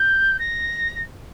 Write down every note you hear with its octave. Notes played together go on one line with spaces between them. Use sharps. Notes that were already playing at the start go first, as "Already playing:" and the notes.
Already playing: G6
A#6